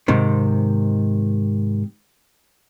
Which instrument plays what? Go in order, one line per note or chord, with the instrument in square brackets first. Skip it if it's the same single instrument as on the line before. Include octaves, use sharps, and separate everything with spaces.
[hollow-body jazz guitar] G#2 C3 D#3